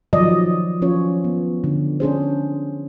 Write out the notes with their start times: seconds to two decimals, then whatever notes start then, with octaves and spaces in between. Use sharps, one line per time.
0.13 D#3 F3 F#3 D5 D#5
0.82 F3 C#4 F4 C#5
1.24 B3
1.64 D3
2.00 C#4 D4 G#4 C5